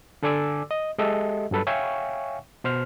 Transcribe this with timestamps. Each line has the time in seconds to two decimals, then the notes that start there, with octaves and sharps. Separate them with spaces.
0.23 D3 A4 D5 G#5 D6 E6
0.71 D#5
0.98 G#3 G4 A4 D#5 E5
1.51 G2 F#3 A4 B4
1.67 C#5 E5 F5 G5 G#5 C#6
2.64 B2 C5 F6